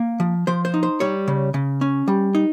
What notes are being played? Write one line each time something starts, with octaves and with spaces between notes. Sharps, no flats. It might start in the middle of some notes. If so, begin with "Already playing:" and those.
Already playing: A#3
F3
F3 C5
C5
D#4
C5
G3 C#5
C#3
C#3
C#4
G3
D#4